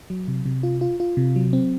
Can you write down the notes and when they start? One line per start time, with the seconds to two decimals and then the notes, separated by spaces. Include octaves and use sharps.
0.10 F#3
0.28 C3
0.46 C3
0.63 F4
0.81 F4
1.00 F4
1.17 C3
1.36 F#3
1.53 C4